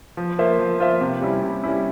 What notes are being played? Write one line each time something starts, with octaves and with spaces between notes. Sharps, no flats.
F3
A#3 F4 C5 E5
F3
A#3 F4 C5 E5
C3
G3 C#4 E4
C3
G3 C#4 E4